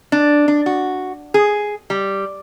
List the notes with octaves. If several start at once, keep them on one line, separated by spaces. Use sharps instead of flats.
D4
D4
F#4
G#4
G3